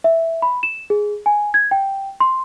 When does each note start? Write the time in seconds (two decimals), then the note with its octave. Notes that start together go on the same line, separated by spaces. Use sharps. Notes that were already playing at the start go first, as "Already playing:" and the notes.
0.04 E5
0.42 B5
0.63 E7
0.90 G#4
1.26 G#5
1.54 G#6
1.71 G5
2.20 C6